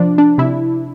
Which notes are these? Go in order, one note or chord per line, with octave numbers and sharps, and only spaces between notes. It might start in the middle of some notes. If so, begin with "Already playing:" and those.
Already playing: C3 F3 D4
D4
C3 E4